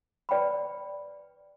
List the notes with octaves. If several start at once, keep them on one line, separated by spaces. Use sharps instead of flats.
B4 D5 G5 B5